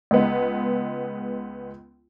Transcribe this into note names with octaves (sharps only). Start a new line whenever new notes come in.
C#2 G#3 B3